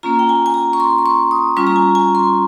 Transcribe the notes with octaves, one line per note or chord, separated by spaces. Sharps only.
A#3 C#4 F4 A#5
G5
G#5
G#5
A#5
C#6
C6
C6
C#6
D#6
G3 C#4 F4 C#6
A#5
G#5
G#5
C6